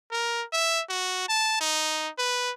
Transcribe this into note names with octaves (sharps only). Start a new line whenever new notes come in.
A#4
E5
F#4
A5
D#4
B4